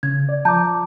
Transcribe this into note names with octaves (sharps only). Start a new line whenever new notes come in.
C#3 G#6
D5
F3 A5 A#5 D6 G6